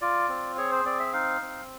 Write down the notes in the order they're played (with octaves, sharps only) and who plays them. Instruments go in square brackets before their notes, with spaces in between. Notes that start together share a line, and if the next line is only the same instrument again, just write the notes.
[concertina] F4 D5
C4
G#4 C#5
C5
C4 D5
E5
D#4 F5
C4